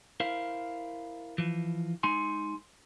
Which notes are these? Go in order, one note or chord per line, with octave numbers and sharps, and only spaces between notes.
E4 A#4 C5 F5
E3 F3
G#3 D#4 G#5 C6